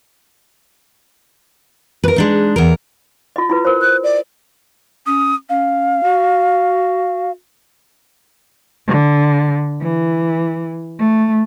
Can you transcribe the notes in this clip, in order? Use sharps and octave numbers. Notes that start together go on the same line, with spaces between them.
A#4 B4
G#3 D4 D#4
E2 A#4
F4 D#5
E4 F4 B4
A#4 C5
F#6
D5
C#4 D#6
C#4 F5
F#4
D3
E3
A3